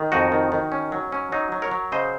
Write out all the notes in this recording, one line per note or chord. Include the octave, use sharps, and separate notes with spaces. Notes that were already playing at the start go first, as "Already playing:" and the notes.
Already playing: D#3
F2 D#4 F#4
D#3
D#3
C#4
F#3
C#4
F#3 D#4
F#3
A#4 C#5
F#3
C#3 C5 D#5